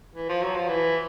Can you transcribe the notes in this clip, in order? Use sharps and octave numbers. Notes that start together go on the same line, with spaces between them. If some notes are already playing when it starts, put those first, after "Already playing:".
E3
F3
F#3
F3
E3